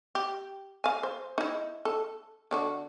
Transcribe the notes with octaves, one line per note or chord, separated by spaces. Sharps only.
G4
F5 G#5
C5
D#4 E4
A4
D3 D4 F#4